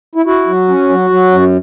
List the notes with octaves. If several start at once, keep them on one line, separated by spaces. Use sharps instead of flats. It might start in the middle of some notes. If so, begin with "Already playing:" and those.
E4
E4 F#4
F#3
C#4
F#3
F#3
F#2